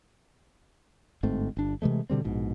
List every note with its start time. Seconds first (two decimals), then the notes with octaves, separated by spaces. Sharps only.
1.23 G1 G#2 A3 C4
1.57 G1 D4
1.82 C3 E3 G#3 A3
2.10 B2 D3 G3 C4
2.25 A#1 G#2 B2